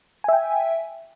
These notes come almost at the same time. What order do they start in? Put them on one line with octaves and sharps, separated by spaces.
G#5 E5 G5